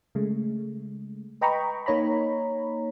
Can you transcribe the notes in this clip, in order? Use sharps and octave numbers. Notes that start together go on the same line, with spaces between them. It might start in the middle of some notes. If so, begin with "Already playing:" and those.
C#3 G#3 A3
B4 D#5 G5 A#5 B5 C#6
A#3 D#4 C#5 A#5 B5